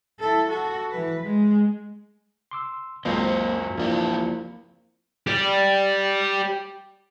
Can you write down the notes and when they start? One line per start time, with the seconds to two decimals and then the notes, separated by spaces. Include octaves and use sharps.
0.20 E4 A4
0.49 F#4 A4
0.90 E3 B4
1.22 G#3
2.51 C6 D6 E6
3.05 C#2 F#2 F#3 A#3 C4 F#4 D#5
3.77 E2 F3 A#3 D4 E4 G4
5.27 G4 D5